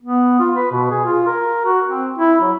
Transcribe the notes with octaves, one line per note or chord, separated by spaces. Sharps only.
B3
F4
B4
B2
G#4
F4
A#4
F#4
C4
E4
F#3